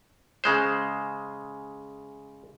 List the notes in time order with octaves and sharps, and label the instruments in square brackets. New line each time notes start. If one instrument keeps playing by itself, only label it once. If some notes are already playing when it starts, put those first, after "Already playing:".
[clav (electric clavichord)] C#3 G#3 C5